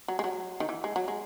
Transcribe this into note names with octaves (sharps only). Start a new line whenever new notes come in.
F#3
G#3
F#3
D#3
E3
G#3
F#3
G#3